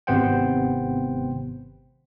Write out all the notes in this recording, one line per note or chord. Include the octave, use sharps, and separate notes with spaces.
G#1 C3 B3 C5 F#5 G5